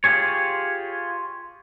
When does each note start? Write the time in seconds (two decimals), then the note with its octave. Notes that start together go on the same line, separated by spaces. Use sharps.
0.04 F4 G4 G#4 C#5